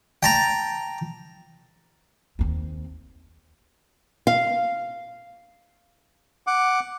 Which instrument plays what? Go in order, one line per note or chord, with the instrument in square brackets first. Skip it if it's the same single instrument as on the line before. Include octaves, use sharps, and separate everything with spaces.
[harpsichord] G5 A5 A#5
[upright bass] D#2 C4
[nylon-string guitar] F5
[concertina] F#5 D6